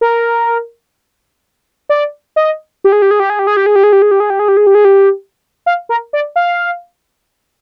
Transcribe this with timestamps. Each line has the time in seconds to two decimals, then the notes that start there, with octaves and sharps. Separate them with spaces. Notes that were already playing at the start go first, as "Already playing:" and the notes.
0.01 A#4
1.89 D5
2.36 D#5
2.84 G4
2.92 G#4
3.02 G4
3.11 G#4
3.20 G4
3.30 G#4
3.39 G4
3.47 G#4
3.57 G4
3.66 G#4
3.76 G4
3.84 G#4
3.93 G4
4.02 G#4
4.11 G4
4.20 G#4
4.30 G4
4.39 G#4
4.48 G4
4.57 G#4
4.67 G4
4.75 G#4
4.85 G4
5.66 F5
5.89 A#4
6.13 D5
6.36 F5